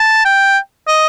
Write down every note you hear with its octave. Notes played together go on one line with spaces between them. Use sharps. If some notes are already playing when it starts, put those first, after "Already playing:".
Already playing: A5
G5
D#5